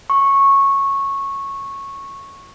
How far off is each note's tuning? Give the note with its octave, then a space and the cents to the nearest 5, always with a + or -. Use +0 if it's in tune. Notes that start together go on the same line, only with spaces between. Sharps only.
C#6 -10